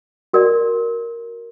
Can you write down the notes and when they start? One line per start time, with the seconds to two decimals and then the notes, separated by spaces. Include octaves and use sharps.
0.33 F#4 A#4 D5